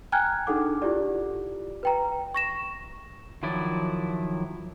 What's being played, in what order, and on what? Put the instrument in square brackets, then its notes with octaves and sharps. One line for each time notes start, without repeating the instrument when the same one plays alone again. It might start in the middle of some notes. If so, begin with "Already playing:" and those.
[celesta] G5 G#5 A#5 F6 F#6 G#6
D4 D#4 G#4 A4 F#5 D6
E4 F4 G4 D5
B4 G5 A#5
C#6 A#6 E7
[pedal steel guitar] D#3 F3 F#3 E4 D5